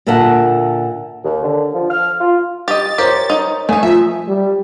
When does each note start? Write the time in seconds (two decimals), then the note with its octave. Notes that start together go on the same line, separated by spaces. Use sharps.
0.07 A#2 D3 A#4 E5 F#5 A5
1.25 D#2
1.43 D3
1.74 F3
1.90 F6
2.19 F4
2.68 G4 D#5 A6
2.98 G4 A#4 C5 C#5
3.30 D#4
3.69 D#3 A3 D#4 G#5
3.83 F3 E5
4.28 G3